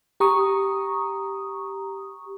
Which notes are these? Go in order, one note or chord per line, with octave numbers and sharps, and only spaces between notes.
G4 A#5 C#6 D#6